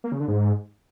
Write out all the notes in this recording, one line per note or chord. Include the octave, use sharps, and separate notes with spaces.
A#3
C#3
D3
G#2